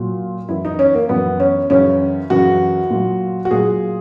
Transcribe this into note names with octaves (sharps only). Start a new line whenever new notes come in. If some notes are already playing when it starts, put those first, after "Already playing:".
Already playing: A#2 F#3
F#2 E3 E4
D#4
C#4
A#3
F#2 E3 B3
C#4
F#2 C#3 E3 C#4
F#2 C#3 E3 F#4
A#2 F#3
F#4
A#2 F#3 G#4